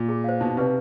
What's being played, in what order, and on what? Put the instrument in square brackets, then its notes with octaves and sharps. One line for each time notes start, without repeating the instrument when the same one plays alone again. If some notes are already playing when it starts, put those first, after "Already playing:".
Already playing: [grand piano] A#2
[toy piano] G#4
C5 F5
[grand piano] B2 [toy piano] D#4
[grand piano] C3 [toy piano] G4 B4 D5